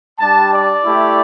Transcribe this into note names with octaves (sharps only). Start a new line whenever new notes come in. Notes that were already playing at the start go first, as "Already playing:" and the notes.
G3 D4 G4 A5
D5
A3 E4 G4